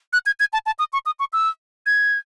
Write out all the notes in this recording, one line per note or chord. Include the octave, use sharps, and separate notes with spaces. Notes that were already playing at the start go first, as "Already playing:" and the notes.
F#6
G#6
G#6
A5
A5
D#6
C#6
D#6
C#6
E6
G#6